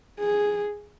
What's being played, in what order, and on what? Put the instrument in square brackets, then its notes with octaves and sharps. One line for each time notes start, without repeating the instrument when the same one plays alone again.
[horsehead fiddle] G#4